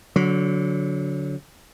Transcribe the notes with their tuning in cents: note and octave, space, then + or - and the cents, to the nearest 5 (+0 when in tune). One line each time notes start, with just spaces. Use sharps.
D3 -30 F#3 -15